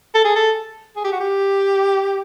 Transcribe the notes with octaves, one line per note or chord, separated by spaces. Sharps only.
A4
G#4
A4
G#4
G4
F#4
G4